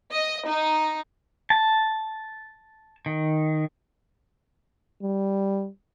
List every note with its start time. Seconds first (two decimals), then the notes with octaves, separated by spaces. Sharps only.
0.12 D#5
0.47 D#4
1.50 A5
3.06 D#3
5.02 G3